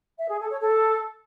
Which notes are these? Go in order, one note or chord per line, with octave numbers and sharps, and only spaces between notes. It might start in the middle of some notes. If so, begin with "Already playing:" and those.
E5
G#4
A4
C#5
A4